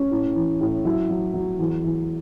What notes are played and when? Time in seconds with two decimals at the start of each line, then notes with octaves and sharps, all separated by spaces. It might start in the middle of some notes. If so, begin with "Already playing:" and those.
Already playing: C#4
0.11 A2
0.36 E3
0.61 A2
0.85 F#3 E4
1.09 F#3
1.34 F#3
1.59 E2
1.84 E2